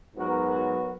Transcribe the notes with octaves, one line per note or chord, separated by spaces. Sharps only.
G#2 F#3 B3 F#4 A#4
F#4 A#4